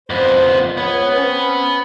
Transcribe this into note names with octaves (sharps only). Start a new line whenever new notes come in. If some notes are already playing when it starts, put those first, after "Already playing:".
F2 B3 C5
C#2 B3 C#5
C4 C#4